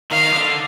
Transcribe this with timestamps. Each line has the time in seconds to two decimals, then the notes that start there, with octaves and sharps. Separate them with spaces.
0.12 D#3 F5
0.33 D3